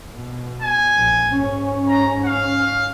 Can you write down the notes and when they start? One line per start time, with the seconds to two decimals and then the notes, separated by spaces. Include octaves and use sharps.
0.15 B2
0.62 G#5
0.96 A#1
1.30 G#2 C#4
1.88 A#5
2.25 F5